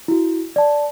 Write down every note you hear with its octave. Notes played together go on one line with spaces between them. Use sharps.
E4 F#4
D5 A5